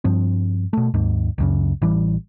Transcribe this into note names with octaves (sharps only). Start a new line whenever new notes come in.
G2 F3 C4
B2 A3
G#1 D#2 G#2
C#2 F#2 C#3
A1 E3 G3